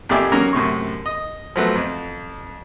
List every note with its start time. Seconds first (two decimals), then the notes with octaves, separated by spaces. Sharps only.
0.09 F2 A#3 G4 D5 E5 G#5
0.32 F#3 A#3 C#4 A#4
0.53 F#2 A2 C3 C#6
1.06 D#5
1.56 F3 F#3 A3 B4
1.75 F2